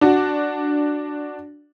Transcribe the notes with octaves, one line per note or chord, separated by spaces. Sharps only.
D4 F#4